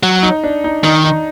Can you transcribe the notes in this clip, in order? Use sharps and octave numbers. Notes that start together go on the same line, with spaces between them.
F#3
D#4
D4
D#4
D#3 D#4
D#4